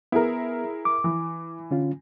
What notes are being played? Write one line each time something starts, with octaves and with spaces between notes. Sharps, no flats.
B3 E4 G#4 A#4
D6
E3
D3 C#4 F4